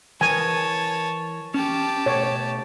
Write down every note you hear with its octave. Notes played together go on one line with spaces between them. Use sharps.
E3 A#4 B4 C#5 G#5 A5
C#4 G4 A5
B2 A3 C#5